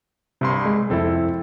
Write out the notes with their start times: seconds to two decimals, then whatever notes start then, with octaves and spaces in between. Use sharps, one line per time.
0.41 C2 G2 C3 C6
0.66 G#3
0.90 C2 F2 C4 E4 A4